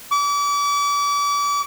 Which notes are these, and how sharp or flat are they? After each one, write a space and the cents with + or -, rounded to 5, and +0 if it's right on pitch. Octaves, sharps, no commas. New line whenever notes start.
D6 -35